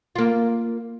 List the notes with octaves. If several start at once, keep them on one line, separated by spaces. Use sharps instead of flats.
A#3 F4